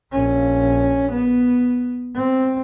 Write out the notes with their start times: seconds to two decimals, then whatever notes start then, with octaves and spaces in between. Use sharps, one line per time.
0.12 A#1 C#4
1.12 B3
2.15 C4